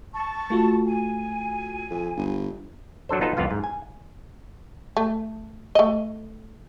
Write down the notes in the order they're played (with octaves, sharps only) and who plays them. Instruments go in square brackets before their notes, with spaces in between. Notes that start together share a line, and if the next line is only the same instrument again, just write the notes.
[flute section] A5 C#6
[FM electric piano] A3 F4 F#4
[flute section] G#5
[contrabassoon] F2
G1
[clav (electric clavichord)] F#3 D4 A4 C5
B3 D#4 F4 A4 B4
C2 F2 B3 F4 F5
G#2
G#5
[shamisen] A3
A3 D#5